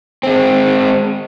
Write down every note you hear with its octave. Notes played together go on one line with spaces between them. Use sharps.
G#3 C4